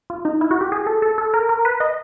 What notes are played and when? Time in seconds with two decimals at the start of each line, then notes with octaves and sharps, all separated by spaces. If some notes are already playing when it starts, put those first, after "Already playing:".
0.10 F4
0.25 D#4
0.41 E4
0.51 F#4
0.61 G4
0.72 G#4
0.87 A4
1.02 A4
1.18 A4
1.34 A#4
1.49 A#4
1.65 B4
1.80 D#5